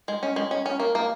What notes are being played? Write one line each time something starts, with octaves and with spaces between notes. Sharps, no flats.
G#3
C#4
G#3
C#4
C#4
A#3
A#3